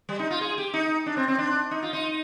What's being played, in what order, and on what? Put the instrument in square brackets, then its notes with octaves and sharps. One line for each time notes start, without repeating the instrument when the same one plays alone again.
[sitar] G3
D#4
F4
G#4
G4
D#4
D4
C4
C4
D4
D#4
F4
D#4